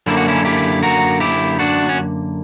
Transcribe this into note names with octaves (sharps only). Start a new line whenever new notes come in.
F#2 D3 A#3 E4
F#4
C#4 E4
E4 G4
F#4 A#4
E4 G4
D4 F#4
C#4